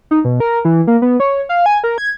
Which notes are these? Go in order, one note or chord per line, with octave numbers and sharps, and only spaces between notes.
D#4
B2
A#4
E3
A#3
B3
C#5
F5
G#5
A#4
G#6